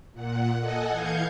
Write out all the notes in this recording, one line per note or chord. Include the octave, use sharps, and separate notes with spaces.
A#2 F#5
A4 D#5 F#5 G#5
E3 F5 G6 G#6 C#7